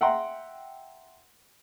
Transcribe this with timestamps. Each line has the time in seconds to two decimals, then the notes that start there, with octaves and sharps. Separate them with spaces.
0.01 E5 F#5 G5 A#5 C6